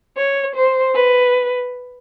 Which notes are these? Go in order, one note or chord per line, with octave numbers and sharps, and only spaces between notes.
C#5
C5
B4